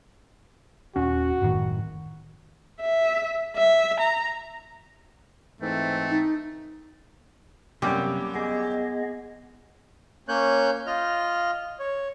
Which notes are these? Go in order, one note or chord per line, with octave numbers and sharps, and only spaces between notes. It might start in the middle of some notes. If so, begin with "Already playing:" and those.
D#1 C#4 F#4
F#1 A2 D#3
E5
E5
A#5
G#2 E3 A3 C4
D#4
F#2 C3 G3 A#3 B3 G4
B3 G#4 D#5
A#3 C#4 C#5 F#6 G6
F4 D#5 F6
C#5